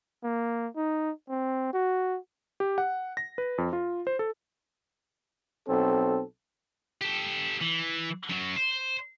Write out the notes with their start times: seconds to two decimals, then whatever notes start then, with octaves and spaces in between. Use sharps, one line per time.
0.23 A#3
0.76 D#4
1.29 C4
1.73 F#4
2.60 G4
2.78 F#5
3.17 A#6
3.38 B4
3.58 F2
3.73 F4
4.07 C5
4.19 A4
5.67 B1 C4 A4
7.01 G4 A4
7.61 E3
8.30 F#2 F#3
8.56 C5